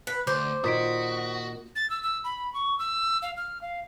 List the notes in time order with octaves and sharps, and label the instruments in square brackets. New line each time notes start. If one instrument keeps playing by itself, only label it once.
[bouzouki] B4
[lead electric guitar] D2 [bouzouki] C5 [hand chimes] D6
[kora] A#2 D#3 [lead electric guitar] F#4 [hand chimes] D#6 B6 D7
[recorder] A6
E6
E6
B5
C#6
E6
F5
F6
F5